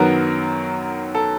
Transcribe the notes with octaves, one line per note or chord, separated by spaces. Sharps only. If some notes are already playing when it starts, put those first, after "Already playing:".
Already playing: F#2 D#3 F#3 B3 A#4
A4